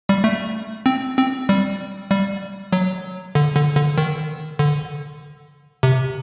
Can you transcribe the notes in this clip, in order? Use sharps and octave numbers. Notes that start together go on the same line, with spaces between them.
G3
A3
C4
C4
G3
G3
F#3
D3
D3
D3
D#3
D3
C3